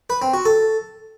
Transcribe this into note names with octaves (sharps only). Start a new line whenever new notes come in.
B4
C4
F#4
A4